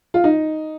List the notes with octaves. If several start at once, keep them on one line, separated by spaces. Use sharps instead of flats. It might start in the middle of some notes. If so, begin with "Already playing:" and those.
F4
D#4